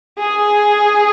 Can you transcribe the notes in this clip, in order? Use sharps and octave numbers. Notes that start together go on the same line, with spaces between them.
G#4